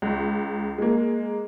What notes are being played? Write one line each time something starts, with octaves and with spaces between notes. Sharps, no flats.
C#2
G#3 A#3